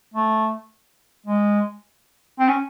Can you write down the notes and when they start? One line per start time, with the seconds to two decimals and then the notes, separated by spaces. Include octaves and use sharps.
0.14 A3
1.26 G#3
2.39 C4
2.49 C#4